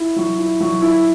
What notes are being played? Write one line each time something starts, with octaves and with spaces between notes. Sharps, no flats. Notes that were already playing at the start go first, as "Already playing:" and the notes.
Already playing: E4
F#3
E4
F#3
E4